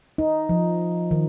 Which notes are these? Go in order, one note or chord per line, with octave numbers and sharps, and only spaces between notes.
D#4
F3
D#3